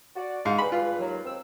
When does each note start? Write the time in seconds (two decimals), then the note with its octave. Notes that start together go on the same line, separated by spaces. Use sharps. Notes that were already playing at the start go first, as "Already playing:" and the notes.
0.16 F#4 D5
0.45 G#2 F5
0.58 G2 G#4 B4 B5
0.72 F4
0.99 D#2 F#3
1.26 D#2 C4 E6